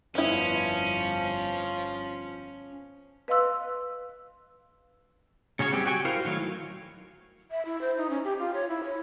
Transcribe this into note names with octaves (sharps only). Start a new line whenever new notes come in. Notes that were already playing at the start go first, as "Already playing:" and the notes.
G1 F2 F3 B3 C#4 E4
B4 D#5 F5 C6 E6 F#6
C#3 C#4 F#4 C#5
F#3 G3 C4 C#4 G4
F#4 G4 G5 G#5 C#6
E4 F#4 A#4 C5 F5
D#3 F#3 A3 C#5 F5
E5
E4
C5
D#4
C#4
G4
F4
C#5
E4
C#5